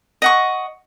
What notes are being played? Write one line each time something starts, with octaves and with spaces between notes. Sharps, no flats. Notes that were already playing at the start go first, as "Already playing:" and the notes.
D#5 F#5 C#6